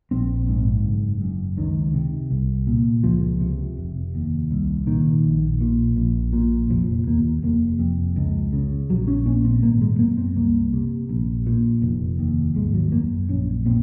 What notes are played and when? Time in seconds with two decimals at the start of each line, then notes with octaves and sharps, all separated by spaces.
0.11 A#1 C4
0.49 G#2
0.84 F#1
1.21 F#2
1.57 C#2 D#3
1.94 C3
2.30 C2
2.67 A#2
3.04 C#2 F3
3.40 C3
3.77 F1
4.15 D#2
4.51 C2
4.86 A#2 D#3
5.24 A#1
5.61 A#2
5.96 A#1
6.33 A#2
6.70 F1 F3
7.07 D#2 A#3
7.43 F1 A#3
7.79 F2
8.16 C#2
8.53 C#3
8.89 A#1 F#3
9.08 C#4
9.26 A#2 C#4
9.45 C4
9.63 G#1 A#3
9.81 G#3
9.99 F#2 A#3
10.17 C4
10.36 C2 A#3
10.73 C3
11.09 A#1
11.46 A#2
11.82 F1
12.19 D#2
12.56 G#1 G#3
12.74 F#3
12.92 F#2 A#3
13.29 A#1 C#4
13.66 A#2 C4